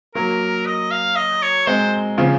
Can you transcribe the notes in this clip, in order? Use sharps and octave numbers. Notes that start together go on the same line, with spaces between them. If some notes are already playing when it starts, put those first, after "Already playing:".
F#3 A#3 A#4
D#5
F5
D#5
C#5
G#3 C4 C5
C#3 F3